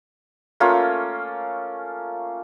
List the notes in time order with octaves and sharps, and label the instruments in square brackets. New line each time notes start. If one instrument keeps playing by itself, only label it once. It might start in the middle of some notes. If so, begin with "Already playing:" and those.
[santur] A3 A#3 C#4 F4